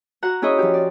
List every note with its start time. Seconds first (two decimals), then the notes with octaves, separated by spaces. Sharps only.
0.22 F#4 F#5 A#5
0.42 C#4 E4 G#4 C#5 D#5
0.58 F3 G4
0.74 D5